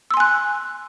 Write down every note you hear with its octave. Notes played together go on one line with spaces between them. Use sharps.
G#5 C6 E6 F#6